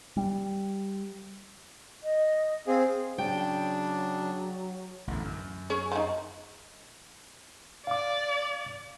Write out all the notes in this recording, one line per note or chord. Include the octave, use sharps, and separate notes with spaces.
G3
D#5
C4 G#4 F5
C#3 F#3 D4 G5
A1 E2 D3
F#2
C#4 G#4 C#5
F3 D#4
D5 F5 D6